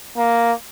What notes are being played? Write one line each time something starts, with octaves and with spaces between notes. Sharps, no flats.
A#3